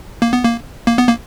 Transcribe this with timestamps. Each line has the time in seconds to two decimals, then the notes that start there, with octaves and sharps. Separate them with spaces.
0.22 A#3
0.33 B3
0.44 A#3
0.87 A#3
0.98 B3
1.08 A#3